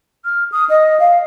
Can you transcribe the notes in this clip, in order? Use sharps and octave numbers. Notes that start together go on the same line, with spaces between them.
F6
D#6
D#5
F5